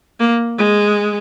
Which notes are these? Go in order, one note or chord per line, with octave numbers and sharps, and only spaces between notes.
A#3
G#3